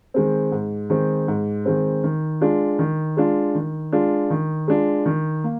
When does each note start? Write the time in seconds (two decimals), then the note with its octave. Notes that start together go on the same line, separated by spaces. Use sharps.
0.14 D#3 G#3 C4
0.52 G#2
0.90 D#3 G#3 C4
1.28 G#2
1.65 D#3 G#3 C4
2.04 D#3
2.41 G#3 D4 F4
2.79 D#3
3.17 G#3 D4 F4
3.55 D#3
3.93 G#3 D4 F4
4.30 D#3
4.68 G#3 D4 F4
5.06 D#3
5.44 A#3